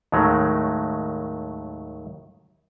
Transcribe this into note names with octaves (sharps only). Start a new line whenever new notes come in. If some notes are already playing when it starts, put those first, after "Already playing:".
D#2 A2 D#3 F#3 G#3 A3